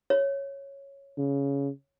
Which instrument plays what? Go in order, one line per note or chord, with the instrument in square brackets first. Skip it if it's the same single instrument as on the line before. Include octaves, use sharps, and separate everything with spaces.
[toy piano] C#5
[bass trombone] C#3